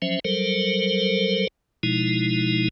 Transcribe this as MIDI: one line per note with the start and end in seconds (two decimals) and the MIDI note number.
0.02 0.20 53
0.02 0.20 54
0.02 0.20 61
0.02 0.20 72
0.02 0.20 76
0.25 1.47 54
0.25 1.47 55
0.25 1.47 69
0.25 1.47 70
0.25 1.47 72
1.83 2.68 47
1.83 2.68 53
1.83 2.68 56
1.83 2.68 63
1.83 2.68 64